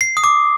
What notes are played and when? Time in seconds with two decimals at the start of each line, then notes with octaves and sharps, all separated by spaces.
0.01 C7
0.17 D#6
0.24 D6